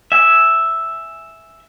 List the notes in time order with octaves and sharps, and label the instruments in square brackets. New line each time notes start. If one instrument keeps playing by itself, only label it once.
[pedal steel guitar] E5 G#5